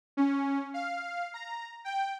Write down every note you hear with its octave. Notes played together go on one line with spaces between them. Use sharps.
C#4
F5
A#5
G5